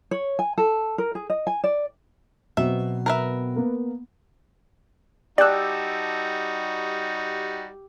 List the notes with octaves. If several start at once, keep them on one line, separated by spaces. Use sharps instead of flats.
C#5
G#5
A4
A#4
G#4
D#5
G#5
D5
B2 F#3 C4 E5
A#4 B4 E5
A#3 B3
G3 D#4 F#4 G4 D5 A5 E6 F#6